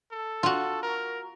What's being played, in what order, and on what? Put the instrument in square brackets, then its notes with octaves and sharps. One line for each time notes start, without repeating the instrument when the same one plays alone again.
[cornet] A4
[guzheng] F4 F#4
[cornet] A#4